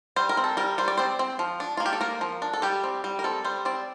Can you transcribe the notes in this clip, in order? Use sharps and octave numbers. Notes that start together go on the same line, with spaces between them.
G3 C5
A#4
C4
A4
G3 A#4
G3 C5
D5
C4 C5
C4
F3
D4
A#3 F4
G4
A4
A#3 A#4
F3
D4
A4
G3 G4
C4
G3
A#4
C4 A4
G3 C5
C4 D5